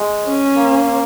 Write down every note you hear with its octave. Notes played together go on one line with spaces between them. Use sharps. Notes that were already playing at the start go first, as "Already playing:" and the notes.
Already playing: G#3
C#4
A#3